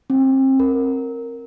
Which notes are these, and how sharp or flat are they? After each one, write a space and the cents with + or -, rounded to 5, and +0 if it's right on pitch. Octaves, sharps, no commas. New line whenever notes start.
C4 +30
A#4 -5